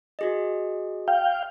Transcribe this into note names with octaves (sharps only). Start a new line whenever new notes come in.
F#4 G#4 D#5
F5 G5